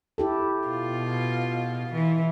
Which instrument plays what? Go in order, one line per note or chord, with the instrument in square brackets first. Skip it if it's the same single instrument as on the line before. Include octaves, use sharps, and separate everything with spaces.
[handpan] E4 G4 A4
[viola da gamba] B2 F4
E3